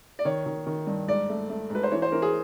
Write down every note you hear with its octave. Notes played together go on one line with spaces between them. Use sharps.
D5
D#3 C#5
D#3
D#3
G2
G#2 D5
A3
A3
G#2
B4
C5
E3 C#5
C5
E3 A#4
G#4